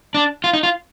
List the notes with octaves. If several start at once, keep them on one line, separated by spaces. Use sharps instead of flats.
D4
F4
D#4
F4